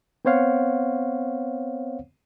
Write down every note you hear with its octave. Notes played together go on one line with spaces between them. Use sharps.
B3 C4 C5 C#5 F5 F#5